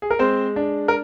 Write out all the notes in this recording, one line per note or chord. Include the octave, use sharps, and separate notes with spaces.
G#4
A#4
G#3 C4 C5
D4
A#4